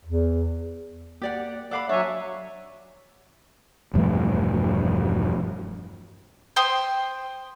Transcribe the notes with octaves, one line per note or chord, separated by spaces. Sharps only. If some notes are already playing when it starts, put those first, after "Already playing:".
E2
A#3 G4 D5 F#5
A4 D5 F5 F#5 B5 D6
F#3 D4 C#5 E5 G#5
E1 G2 F3 A3
C5 G5 C6 D#6